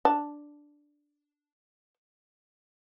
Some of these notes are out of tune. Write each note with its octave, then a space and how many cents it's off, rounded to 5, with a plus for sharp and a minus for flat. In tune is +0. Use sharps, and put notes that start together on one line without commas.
D4 +0 A5 +0